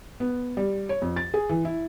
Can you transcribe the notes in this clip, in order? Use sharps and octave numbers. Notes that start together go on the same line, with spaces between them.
B3
G3
C#5
F2
A6
G#4
E3
E4